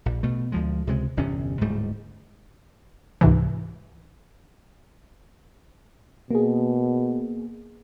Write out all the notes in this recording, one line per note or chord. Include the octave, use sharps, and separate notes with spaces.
A#1
B2 A3
D2 F3 G#3
C#2 C3 G#3
G1 E2 C3 C#4
D1 G#2 G3 A3
C#2 G#2 C3 E3
B2 A#3 G#4